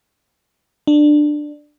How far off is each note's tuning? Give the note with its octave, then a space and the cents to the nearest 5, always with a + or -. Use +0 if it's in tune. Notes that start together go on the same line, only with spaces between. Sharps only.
D4 +15